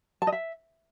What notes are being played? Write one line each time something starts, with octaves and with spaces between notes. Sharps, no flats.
A5
D#5
E5